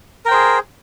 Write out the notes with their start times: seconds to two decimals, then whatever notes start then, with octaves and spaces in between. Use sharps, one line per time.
0.25 A#4
0.28 G5
0.31 C5
0.33 G#4